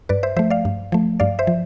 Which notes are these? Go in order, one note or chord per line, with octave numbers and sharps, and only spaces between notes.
G2 B4 D5
C5 E5
F3 A3 C5 E5
D5 F5
G2
F3 A3
G2 D5 F5
C5 E5
F3